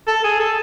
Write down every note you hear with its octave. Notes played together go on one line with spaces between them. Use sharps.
A4
G#4
A4